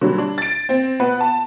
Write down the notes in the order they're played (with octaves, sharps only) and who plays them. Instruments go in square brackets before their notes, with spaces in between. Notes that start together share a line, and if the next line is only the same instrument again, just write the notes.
[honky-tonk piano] D3 F#3 G3
D4
A6 D7
C4
B3 B4 F#5
A5